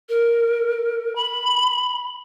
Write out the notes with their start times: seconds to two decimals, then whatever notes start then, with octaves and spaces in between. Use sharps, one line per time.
0.09 A#4
1.16 B5